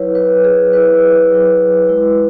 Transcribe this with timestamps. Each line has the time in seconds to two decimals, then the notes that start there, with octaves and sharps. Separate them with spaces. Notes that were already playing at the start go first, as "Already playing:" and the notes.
Already playing: F#3 E4 B4 C#5
0.15 F#3 E4 B4
0.44 G#4
0.73 F#3 E4 B4
1.31 F#3 E4
1.89 G#3 E4